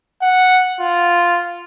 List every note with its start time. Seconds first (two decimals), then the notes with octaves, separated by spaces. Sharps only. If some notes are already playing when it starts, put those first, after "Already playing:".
0.22 F#5
0.80 F4